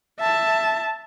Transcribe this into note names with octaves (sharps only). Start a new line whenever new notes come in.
E5 A5